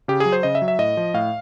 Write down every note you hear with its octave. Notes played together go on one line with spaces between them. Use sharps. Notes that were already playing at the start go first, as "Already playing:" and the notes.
C#3 G4
G#4
F#3
C5
C#3 D#5
E5
F#3
E5
A2 D#5
F3
A2 F5